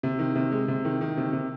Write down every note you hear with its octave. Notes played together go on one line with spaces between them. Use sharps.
C3
D#3
C3
G#3
C3
D#3
D#3
C3
C3